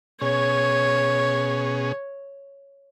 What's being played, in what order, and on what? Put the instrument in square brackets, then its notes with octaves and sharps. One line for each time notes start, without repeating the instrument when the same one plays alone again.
[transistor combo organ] B2 C#4 G#4 [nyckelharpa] C#5